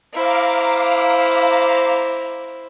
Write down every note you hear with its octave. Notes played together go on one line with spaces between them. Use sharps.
E4 C5 F5 A#5 D6